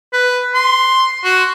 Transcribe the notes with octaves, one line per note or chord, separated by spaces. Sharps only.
B4
C6
F#4